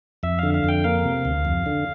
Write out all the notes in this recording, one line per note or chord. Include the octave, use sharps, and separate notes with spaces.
F2 E5
D3 F5
F5
F2 G5
A#3 F5
C3
D2
F2
D3